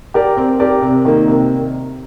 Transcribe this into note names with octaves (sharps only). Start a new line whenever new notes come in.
G4 A#4 D5
C4
G4 A#4 D5
C3
D#3 A#3
C3